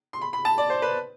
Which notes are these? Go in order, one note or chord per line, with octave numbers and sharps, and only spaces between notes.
C6
B5
B5
A5
D5
C5
B4